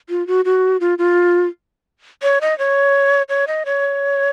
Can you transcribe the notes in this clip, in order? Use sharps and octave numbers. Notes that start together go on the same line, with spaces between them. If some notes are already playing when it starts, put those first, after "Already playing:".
F4
F#4
F#4
F4
F4
C#5
D#5
C#5
C#5
D#5
C#5